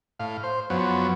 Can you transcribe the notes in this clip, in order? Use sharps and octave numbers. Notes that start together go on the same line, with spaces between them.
A2 F5
C5
F#2 F3 F#3 B3